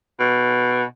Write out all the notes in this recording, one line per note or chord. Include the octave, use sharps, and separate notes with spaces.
B2